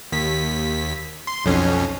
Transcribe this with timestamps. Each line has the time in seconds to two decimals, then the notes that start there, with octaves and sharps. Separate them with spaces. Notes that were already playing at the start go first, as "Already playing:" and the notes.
0.12 D#2 B6
1.27 C6
1.45 B1 F2 C#4